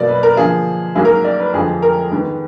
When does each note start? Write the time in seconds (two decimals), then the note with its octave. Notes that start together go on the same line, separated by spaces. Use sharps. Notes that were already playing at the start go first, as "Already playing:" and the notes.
Already playing: B2 F#3 A#3 D5
0.09 B4
0.23 A#4
0.37 D3 F3 A#3 G#4
0.95 G#2 F#3 A#3 G#4
1.05 A#4
1.24 D5
1.39 B4
1.53 F2 D3 F3 G#3 G#4
1.82 A#4
2.12 G#2 D#3 G#3 B3